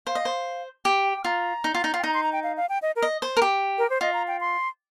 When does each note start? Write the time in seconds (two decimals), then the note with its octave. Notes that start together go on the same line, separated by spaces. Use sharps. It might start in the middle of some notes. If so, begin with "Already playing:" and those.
0.07 C5 F5
0.15 D#5
0.25 C5
0.85 G4 G5
1.13 G5
1.24 F4 A#5
1.64 D#4
1.75 F4
1.84 D#4
1.94 F4
1.99 G5
2.03 D#4 A#5
2.14 C6
2.23 A#5
2.33 G5
2.43 F5
2.57 F5
2.69 G5
2.82 D#5
2.96 A#4
3.02 D#5
3.22 C5
3.37 A#4
3.42 G4
3.78 A#4
3.90 C5
4.01 F4 D#5
4.13 A#5
4.28 G5
4.40 C6